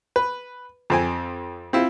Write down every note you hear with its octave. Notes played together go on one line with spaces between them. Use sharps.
B4
F2 C4 G#5
C4 E4 F4